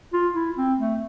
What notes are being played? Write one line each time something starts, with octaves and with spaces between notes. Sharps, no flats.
F4
E4
C4
A3